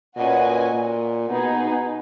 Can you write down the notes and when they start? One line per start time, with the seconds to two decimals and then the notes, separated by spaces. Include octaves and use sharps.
0.17 A#2 C#4 F#4 B4 D#5 G#5
0.73 A#2
1.30 B2 B3 D#4 G#4
1.58 B2